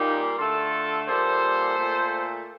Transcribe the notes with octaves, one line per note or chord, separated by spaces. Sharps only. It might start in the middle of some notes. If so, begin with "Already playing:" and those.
Already playing: A#2 G3 A#3 D#4 G4
D3 A3 F4 A4
A#2 G3 A#3 A4 C5
A#2 A3